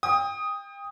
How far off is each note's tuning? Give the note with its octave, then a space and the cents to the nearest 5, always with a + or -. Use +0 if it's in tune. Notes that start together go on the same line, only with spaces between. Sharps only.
G5 +30 D#6 +0